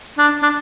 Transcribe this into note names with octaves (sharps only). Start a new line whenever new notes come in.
D4
D4